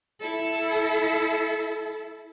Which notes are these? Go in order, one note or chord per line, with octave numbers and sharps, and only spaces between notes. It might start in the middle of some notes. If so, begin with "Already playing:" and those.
E4 A4